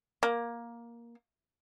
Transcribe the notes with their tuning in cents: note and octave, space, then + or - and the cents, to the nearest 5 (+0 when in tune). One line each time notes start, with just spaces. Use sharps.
A#3 +10